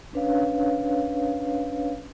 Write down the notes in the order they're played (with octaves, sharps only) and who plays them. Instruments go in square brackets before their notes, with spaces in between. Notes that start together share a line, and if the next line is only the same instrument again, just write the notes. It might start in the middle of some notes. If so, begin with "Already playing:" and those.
[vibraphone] C#4 D4 B4 C#5 F5